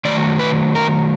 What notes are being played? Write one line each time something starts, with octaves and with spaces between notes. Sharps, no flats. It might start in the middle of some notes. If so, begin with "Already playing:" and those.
D#3 F#3 A3 D5
B4
A#4